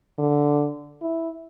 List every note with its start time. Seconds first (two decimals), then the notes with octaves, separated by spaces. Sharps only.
0.19 D3
1.01 E4